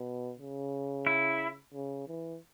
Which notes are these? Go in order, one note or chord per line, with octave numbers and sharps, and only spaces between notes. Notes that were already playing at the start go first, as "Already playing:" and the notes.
Already playing: B2
C#3
E4
C#3
E3